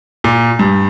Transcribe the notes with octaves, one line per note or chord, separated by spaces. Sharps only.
A#2
G2